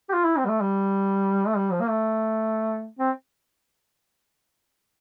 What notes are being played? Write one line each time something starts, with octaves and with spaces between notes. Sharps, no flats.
G4
F4
E4
C4
G3
A3
G3
A3
G3
F3
A#3
A3
C4